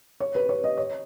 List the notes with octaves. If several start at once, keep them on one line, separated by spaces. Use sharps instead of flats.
C#5
B4
C#5
D#5
C#5